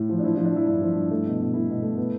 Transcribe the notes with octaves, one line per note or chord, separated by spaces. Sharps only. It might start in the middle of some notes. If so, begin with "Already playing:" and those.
Already playing: A2
F3
D4
F3 E4
D4
F3
D4
F3 E4
G2 E4
F3
G2
A3
B2
B2
A3 E4
B2
A3
B3